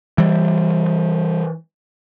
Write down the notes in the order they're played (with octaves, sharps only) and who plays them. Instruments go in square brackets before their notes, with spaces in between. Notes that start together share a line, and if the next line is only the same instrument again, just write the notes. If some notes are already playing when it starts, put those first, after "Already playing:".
[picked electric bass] E3 G3